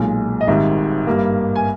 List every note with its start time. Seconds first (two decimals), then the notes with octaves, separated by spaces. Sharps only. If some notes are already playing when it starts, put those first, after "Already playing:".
Already playing: B1 A#2 G#3
0.41 D#5
0.47 G#1 G#2 D#3 G3 E5
1.07 G2 G3 A#3
1.55 G#5